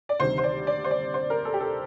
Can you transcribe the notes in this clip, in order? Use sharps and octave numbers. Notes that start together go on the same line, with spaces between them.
D5
D2 C3 D#3 G3 C5
C5
D5
D5
C5
D5
C5
A#4
A4
G4
A4